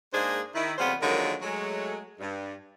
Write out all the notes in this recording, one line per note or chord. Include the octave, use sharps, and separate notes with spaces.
G#2 G#3 A#3 D4 G#4 C5
D#3 E4
F2 C#3 G3 B3 F4 C5
D3 D#3 F3 F#3 G#3 A#3
F#3 G#3 A3
G2